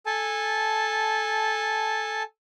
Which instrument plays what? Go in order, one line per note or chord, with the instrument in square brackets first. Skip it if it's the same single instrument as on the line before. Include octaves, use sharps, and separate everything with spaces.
[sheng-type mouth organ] A4 G#5 A5